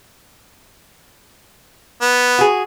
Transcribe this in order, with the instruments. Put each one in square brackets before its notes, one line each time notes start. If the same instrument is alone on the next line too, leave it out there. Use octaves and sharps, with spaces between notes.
[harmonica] B3
[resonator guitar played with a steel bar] F#4 G#4